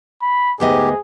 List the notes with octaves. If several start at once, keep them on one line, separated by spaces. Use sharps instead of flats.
B5
D2 G#2 B3 G4 G#4 D#5